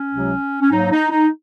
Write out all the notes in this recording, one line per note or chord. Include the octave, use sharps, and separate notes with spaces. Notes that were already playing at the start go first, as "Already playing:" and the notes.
Already playing: C#4
C#2 C3 F#3
C#4
G#2 F#3 A#3 D#4
D#4
D#4